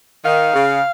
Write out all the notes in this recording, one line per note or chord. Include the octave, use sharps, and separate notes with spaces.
D#3 F5
C#3